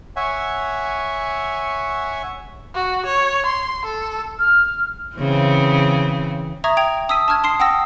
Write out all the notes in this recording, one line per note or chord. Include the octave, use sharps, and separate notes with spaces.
C#5 E5 F#5 G#5
F#4
C#5
C6
A4
F6
C#3 E3 C4
E5 A#5 C#6 D#6 G#6 A#6
G5 G#6 D7 F7
A5 D#6 E6 B6 D#7
A5 C#6 F6 G#6
A5 C6 D#6 C7
F#5 G5 A5 D#6 E6 A#6